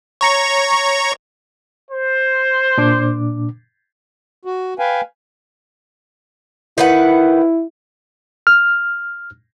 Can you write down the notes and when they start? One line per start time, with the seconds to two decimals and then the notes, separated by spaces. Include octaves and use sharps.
0.21 C#5 A#5 C#6
1.90 C5
2.78 A#2 D4 D6
4.45 F#4
4.79 B4 F5 G5 G#5
6.78 D#3 E4 B4 F#5
8.47 F6